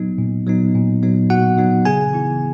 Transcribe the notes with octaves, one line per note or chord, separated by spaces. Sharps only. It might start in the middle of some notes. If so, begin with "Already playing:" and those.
Already playing: A#2 F#3 B3 D#4
A#2
F#3 B3 D#4
A#2
F#3 B3 D#4
A#2 F#4 F#5
F#3 B3 D#4
C#3 G#4 G#5
E3 B3 E4